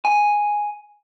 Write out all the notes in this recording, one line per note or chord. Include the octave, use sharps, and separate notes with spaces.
G#5